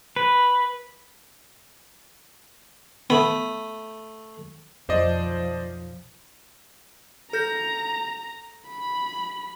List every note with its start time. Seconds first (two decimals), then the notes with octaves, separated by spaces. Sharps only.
0.16 B4
3.10 A3 B3 B5 D#6
4.89 B1 F2 F3 C5 D5 D#5
7.33 A4 A#5 G6 A#6
8.70 B5